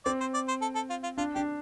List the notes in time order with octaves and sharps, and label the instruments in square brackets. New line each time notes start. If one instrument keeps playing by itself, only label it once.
[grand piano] C4 [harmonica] D5
[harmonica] C5
D5
C5
A4
A4
F4
F4
[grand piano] D4 [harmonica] F4
[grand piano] D4 [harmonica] G4